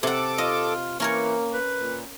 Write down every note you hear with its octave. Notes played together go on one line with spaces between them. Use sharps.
C3 A4 F#5 D6
F4 D#5
E3 A#3 C#4 A#4 C#5
B4
A#2